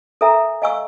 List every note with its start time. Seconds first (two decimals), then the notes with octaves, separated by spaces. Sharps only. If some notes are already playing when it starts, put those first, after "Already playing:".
0.21 A4 A#4 E5 G#5 A#5
0.62 D#5 F5 G#5 C#6 E6